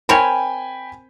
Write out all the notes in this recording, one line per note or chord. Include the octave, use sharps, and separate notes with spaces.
C4 A#4 C#5 G5 G#5 B5